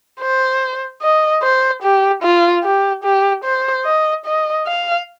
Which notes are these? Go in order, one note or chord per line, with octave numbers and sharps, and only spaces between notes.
C5
D#5
C5
G4
F4
G4
G4
C5
D#5
D#5
F5